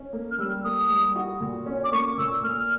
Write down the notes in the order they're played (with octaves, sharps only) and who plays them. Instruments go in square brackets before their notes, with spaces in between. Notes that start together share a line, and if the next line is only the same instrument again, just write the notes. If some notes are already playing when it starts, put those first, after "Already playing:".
Already playing: [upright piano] C#4
A#3
[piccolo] F6
[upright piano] G3 [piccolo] E6
[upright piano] A#3 [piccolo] D#6
[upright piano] G3
F#4
A#2
C#4
[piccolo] D6
[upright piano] A#3 [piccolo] C#6
[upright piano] A#2 [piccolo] E6
[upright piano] A#3 [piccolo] F6